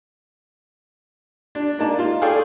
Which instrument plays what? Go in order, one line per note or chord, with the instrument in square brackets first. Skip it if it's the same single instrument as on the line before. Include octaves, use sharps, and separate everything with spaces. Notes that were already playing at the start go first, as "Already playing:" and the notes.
[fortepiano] D4
G#2 A#3 D#4 D5 A5
F4
G#4 A4 C#5 D5 F5 G5